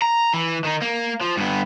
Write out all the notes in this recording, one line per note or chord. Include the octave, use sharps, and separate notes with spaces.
A#5
E3
D#3 D#4
A#3
F3
G2 B3